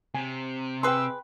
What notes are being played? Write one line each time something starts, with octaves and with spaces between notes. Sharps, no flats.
C3 G#5
G#4 B4 G5 C6 E6